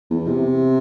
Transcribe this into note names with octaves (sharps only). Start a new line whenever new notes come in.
E2
C3